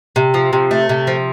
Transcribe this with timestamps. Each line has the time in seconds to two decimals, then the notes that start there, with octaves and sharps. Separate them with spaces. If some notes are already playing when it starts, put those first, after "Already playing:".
0.16 C3
0.34 F3
0.53 C3
0.71 A3
0.89 C3
1.07 F3